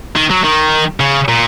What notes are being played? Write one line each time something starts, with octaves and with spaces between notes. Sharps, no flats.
D#3
F#3
D#3
C#3
A#2